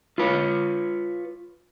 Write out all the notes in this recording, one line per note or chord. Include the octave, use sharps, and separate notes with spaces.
F4 B4 C#5